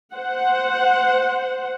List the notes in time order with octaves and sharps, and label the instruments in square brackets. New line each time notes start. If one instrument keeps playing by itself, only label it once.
[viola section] C5 F#5